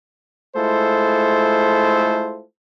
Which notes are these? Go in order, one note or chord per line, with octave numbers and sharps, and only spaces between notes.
G#3 A3 E4 F4 A4 C5